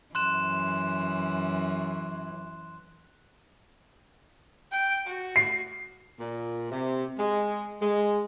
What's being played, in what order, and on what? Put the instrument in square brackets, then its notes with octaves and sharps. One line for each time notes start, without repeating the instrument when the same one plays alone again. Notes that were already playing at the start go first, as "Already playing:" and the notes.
[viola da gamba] F#2 E3 [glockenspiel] C6 F#6 E7
[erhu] G5
F#4
[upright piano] C7
[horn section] A#2
C3
G#3
G#3